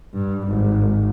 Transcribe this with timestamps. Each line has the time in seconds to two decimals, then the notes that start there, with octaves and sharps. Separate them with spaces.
0.14 G2
0.48 G#1